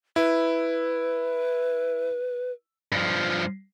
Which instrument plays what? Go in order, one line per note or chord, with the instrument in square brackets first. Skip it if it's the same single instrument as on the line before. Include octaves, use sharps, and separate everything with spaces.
[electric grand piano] E4 [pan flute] B4
[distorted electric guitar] G2 F3